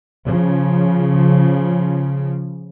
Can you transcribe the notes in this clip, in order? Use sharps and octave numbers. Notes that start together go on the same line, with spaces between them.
C#3 F3